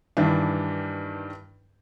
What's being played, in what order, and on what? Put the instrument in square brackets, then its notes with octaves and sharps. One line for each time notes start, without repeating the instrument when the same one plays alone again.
[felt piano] G2 D#3 E3 D4